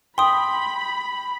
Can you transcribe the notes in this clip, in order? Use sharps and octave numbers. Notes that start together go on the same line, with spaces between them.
G5 B5 C6 D#6